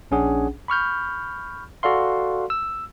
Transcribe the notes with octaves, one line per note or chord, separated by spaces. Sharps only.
A#1 C#4 D4 G#4 F#5
B5 C#6 F6 G6
F#4 A4 D5 F5 C6
E6